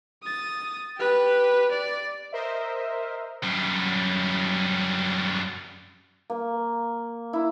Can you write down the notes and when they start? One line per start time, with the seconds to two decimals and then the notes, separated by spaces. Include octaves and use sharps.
0.23 D#6 A6
0.97 G4 B4
1.71 D5
2.32 A#4 C5 D#5 E5
3.43 F#2 G3
6.30 A#3
7.33 E4